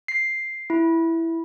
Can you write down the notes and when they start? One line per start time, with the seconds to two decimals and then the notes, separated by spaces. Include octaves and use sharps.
0.08 C7
0.70 E4